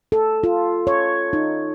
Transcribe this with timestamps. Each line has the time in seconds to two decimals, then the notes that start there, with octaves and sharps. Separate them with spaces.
0.12 A4
0.44 F4
0.87 C#5
1.33 D#4